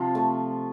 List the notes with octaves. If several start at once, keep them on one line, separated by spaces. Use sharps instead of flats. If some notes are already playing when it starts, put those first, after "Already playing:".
Already playing: C3 F3 F4
A3